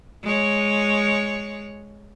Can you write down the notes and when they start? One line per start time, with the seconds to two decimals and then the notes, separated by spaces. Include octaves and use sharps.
0.23 G#3 C#5